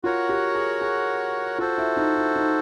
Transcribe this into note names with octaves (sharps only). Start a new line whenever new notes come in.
F4 F#4 A#4 C#5 F#5
G4
G#4
G#4
F4 F#4 A4 C5
E4
D#4
E4
D#4